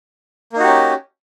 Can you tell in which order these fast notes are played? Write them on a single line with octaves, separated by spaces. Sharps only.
A#3 D#4 F#4 G4 C#4